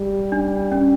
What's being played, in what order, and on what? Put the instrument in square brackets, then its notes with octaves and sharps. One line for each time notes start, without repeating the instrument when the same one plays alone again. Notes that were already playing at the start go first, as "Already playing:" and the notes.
Already playing: [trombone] G3
[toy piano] D4
C#4